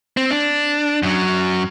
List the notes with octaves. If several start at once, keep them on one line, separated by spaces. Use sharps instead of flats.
C4
D4
F#2 F#3